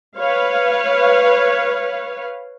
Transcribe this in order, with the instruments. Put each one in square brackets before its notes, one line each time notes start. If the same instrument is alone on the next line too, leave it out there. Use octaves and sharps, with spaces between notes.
[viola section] B4 C#5 F5